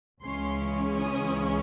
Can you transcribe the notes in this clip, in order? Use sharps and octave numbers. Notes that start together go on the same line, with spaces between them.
C#2 C#3 E3 G#3 C#4 C6
D#6